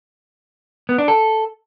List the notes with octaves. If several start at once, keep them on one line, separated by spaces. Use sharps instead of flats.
B3
D4
A4